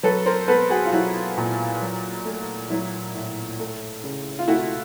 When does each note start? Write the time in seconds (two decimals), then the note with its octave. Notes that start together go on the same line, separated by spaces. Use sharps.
0.03 F#3 A4 B4
0.26 A#4 C5
0.48 B3 A4 B4
0.70 F#4 G#4
0.86 F4
0.92 F#3 E4 F#4
1.38 A#2
1.82 F#3
2.25 A3
2.70 F#3 E4
3.15 A2
3.59 A3
4.04 C#3
4.39 F4
4.48 A3 E4 F#4